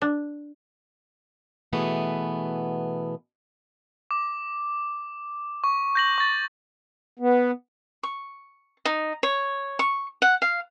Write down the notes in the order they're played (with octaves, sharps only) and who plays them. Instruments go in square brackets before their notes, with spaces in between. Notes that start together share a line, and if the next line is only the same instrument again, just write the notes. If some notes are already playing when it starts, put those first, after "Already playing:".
[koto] D4
[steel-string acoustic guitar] B2 E3 A3 B3 G#4
[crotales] D6
C#6
G6 A#6 F#7
C#6 A6
[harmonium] B3
[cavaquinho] C#6
D#4
C#5
C#6
F#5
F5